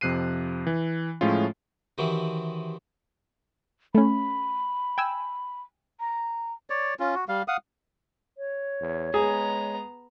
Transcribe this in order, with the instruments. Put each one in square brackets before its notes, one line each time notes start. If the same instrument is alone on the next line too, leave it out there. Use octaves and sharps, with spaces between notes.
[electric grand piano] F2 C3 F3 F#6 C7 D#7
E3
A2 F3 G#3 A3 C#4 F4
[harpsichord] C3 D#3 E3 F#3 C4
[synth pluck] A3 C#4 [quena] B5
[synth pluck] G5 G#5 E6
[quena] A#5
[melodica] C#5 D5
C#4 F4
F#4
G3 F5
F5 F#5 D#6
[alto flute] C#5
[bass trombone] E2
[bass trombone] G#3 [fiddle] B3 A#5 [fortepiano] G#4